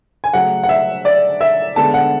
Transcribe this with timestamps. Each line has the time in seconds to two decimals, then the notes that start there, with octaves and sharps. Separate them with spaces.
0.24 G#5
0.33 C#3 F#3 A3 F#5
0.63 F#5
0.69 E5
1.05 D5
1.41 E5
1.76 D3 G#3 B3 A5
1.94 F#5